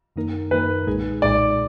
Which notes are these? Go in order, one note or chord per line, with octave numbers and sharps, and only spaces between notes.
F#2 D#3 A#3 D#4 A#4
F#2 D#3 A#3 D#4 A#4 B4
B1 A#2 G#3 D#4 G#4
B1 A#2 G#3 D#4 G#4 D5